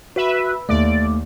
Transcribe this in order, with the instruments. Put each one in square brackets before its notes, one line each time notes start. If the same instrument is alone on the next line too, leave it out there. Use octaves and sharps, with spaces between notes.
[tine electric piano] F#4 [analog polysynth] B4 E5
[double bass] D#2 [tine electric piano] A3 [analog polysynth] D5